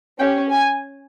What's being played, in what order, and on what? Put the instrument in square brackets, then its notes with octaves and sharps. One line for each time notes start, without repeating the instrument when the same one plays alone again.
[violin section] C#4 G4 G5
G#5